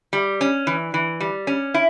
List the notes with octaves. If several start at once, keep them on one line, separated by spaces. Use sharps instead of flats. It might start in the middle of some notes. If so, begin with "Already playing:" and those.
G3
C#4
E3
E3
G3
C#4
E4